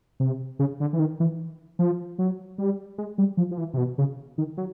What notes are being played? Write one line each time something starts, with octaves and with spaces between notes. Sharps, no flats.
C3
C#3
D3
E3
D#3
E3
F3
F#3
G3
G#3
G3
F3
F3
E3
C3
B2
C#3
D#3
F#3